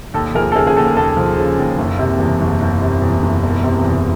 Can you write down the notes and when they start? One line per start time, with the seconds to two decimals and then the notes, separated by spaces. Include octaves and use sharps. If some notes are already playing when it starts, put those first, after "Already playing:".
0.14 D#2 A4
0.34 F3 G#4 A#4
0.52 A4
0.55 C#3 G#4 A#4
0.67 G#4
0.77 D#2 A4
0.96 D#2 A4
1.17 F3
1.38 C#3
1.59 D#2
1.78 F#1
1.99 C3
2.20 E2
2.41 F#1
2.61 F#1
2.81 C3
3.02 E2
3.23 F#1
3.43 E1
3.64 C3
3.84 E2